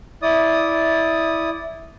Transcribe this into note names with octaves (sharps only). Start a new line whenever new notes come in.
E4 D5 D#6